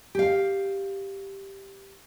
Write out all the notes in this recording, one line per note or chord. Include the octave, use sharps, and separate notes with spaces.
G4 F5